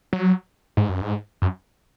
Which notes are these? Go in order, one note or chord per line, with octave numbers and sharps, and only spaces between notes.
F#3
G#2
F#2
G#2
F#2